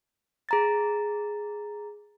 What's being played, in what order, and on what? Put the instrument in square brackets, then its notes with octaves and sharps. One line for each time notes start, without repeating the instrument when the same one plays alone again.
[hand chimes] G#4 A#5 A6